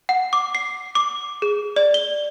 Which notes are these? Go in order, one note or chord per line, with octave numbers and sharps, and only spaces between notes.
F#5
D6
C7
D6
G#4
D5
G7